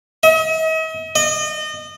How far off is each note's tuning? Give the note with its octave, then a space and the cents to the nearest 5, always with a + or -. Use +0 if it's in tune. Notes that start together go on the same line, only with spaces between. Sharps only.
D#5 +45
D#5 -30